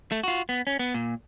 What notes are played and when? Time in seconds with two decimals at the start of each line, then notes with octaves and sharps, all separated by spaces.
0.12 A3
0.24 F4 F#4
0.49 B3
0.67 C#4
0.79 B3
0.94 A#2